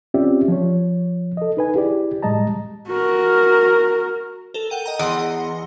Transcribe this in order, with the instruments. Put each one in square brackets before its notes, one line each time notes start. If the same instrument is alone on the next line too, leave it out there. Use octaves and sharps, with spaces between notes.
[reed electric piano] C4 C#4 F4 G4 D5 E5
F3 C#5
A4 D#5
D#4 B4 G#5
E4 G4 G#4 D5
A2 G3 G#3 D#5 A5 A#5
[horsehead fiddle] F#4 A#4
[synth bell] A4 A#4 G7
F#5 G5 D#7
D#5 G5 A#5
[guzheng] E2 [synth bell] D#5 F#5 C6